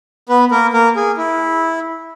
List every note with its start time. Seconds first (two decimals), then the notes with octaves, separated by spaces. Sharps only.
0.29 B3 B4
0.51 A#3 A#4
0.73 A#3 A#4
0.96 G#4
1.17 E4